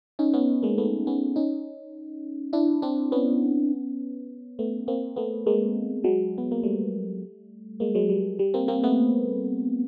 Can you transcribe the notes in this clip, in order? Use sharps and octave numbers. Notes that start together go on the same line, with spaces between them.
C#4 D#4
B3 C#4
G#3 A#3
A3 B3
B3 C#4
C#4 D#4
D4 E4
C4 D4
B3 C#4
A3 B3
A#3 C4
A3 B3
G#3 A#3
F#3 G#3
B3
A#3
G3 A3
G#3 A#3
F#3 G#3
G3
G3
A#3 C4
A#3 C4
A3 B3